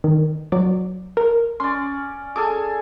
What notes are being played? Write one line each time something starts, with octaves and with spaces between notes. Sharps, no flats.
D#3
F#3 D5
A#4
C#4 D5 C6
G#4 A4 G#5 D6